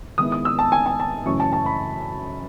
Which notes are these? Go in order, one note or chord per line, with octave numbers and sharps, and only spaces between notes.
D#3 G#3 B3 E4 D#6
D#6
E6
A5
G#5
G#5
A5
F#2 C#3 E3 A3 C#4 C#6
A5
A5
B5